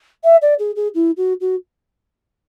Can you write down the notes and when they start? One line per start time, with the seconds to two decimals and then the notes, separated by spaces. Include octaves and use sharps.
0.24 E5
0.42 D5
0.59 G#4
0.76 G#4
0.94 E4
1.17 F#4
1.41 F#4